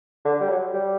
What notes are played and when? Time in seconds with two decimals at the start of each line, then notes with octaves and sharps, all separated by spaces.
0.25 D3
0.40 G3
0.49 F#3
0.73 G3